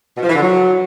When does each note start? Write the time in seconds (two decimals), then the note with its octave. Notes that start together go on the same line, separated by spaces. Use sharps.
0.16 B2
0.23 F3
0.29 E3
0.35 D3
0.42 F#3